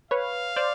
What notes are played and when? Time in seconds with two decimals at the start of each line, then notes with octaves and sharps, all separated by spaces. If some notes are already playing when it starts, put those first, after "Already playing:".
0.11 B4 C#5 F5
0.56 C5 D5